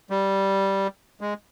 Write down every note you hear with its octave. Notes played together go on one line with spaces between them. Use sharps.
G3
G#3